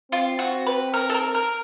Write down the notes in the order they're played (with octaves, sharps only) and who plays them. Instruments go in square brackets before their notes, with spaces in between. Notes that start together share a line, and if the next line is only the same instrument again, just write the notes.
[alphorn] C4 [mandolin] F4
[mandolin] F#4
B4
A#4
A4
A#4
A#4